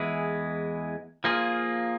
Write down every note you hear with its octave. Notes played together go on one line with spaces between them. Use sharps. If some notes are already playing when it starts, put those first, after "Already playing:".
Already playing: E2 E3 G#3 E4 G#4
F3 A#3 F4 G#4